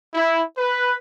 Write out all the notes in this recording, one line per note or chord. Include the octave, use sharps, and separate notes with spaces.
E4
B4